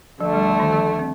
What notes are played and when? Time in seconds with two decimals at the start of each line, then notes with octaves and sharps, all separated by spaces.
0.20 D2 D3 F3 A3
0.34 G3
0.47 F3
0.60 D#3
0.73 F3
0.99 C4